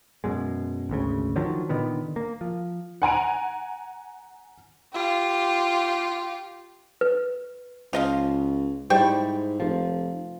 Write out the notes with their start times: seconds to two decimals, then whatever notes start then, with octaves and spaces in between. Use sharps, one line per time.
0.24 F#2 B2 G#3
0.90 G#1 D2 C#3
1.36 D3 D#3 F3 F#3
1.69 A#2 D3 D#3 B3
2.16 A#3
2.41 F3
3.02 F#5 G#5 A#5 D7
4.93 F4 G4
7.01 B4
7.93 C#2 F3 D#5 F5
8.90 G#2 G3 E4 C5 D5 G5 C#6
9.60 F1 F3